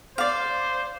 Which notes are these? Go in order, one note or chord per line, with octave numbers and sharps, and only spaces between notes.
C5 D5 F5